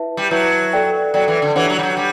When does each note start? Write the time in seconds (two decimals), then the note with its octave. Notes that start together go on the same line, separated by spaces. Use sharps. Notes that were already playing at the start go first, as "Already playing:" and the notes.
Already playing: E4 B4 E5 A5
0.17 G3
0.31 F#3 E4 B4 E5 A5
0.73 A4 D5 G5
1.14 F#3 A4 D5 G5
1.28 E3
1.42 D3
1.55 E3 D4 G4 C#5 F#5
1.70 F#3
1.79 G3
1.83 F#3
1.97 G3